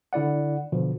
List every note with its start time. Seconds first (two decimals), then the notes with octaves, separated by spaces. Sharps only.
0.13 D3 E4 D5 F#5
0.72 B2 D3 F3